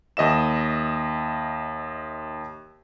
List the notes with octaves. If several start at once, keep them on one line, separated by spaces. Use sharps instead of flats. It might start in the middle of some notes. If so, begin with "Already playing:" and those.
D#2 D#5 E5 E7